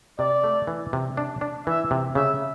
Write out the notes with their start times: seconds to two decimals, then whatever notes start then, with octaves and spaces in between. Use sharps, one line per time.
0.19 C3 D5
0.44 A3
0.67 E3
0.93 C3
1.17 D4
1.41 D4
1.67 E3 E5
1.91 C3
2.15 C#3 E5